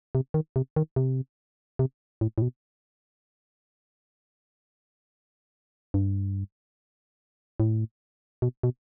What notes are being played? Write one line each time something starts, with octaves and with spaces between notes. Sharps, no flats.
C3
D#3
C3
D#3
C3
C3
A2
A2
B2
G2
A2
B2
B2